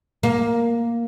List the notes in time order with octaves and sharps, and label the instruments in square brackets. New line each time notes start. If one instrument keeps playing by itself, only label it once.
[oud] A#3